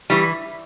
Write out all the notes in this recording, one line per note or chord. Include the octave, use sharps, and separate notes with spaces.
E3 G3